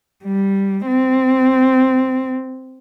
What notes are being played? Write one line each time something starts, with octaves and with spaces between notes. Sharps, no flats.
G3
C4